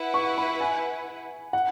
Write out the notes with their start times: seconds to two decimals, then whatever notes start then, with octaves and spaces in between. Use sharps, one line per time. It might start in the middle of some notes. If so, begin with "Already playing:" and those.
Already playing: E4 B4 F#5
0.14 C#6
0.38 B5
0.60 G#5
1.53 F#5